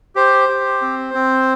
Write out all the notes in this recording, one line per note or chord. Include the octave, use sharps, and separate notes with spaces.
G4 C5
G4
C4
C4